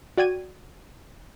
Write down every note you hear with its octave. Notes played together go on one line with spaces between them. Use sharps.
F#4 D5 G5 G#6 D#7